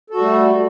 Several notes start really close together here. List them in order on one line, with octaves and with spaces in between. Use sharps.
A4 F#4 G3 A3